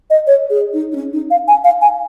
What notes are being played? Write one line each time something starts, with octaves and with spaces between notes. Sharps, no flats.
D#5
C#5
G#4
D#4
D#4
C#4
D#4
F5
G#5
F5
G#5